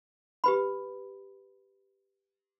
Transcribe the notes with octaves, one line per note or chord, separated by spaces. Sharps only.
G4 B4 B5